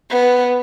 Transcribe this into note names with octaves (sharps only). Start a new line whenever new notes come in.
B3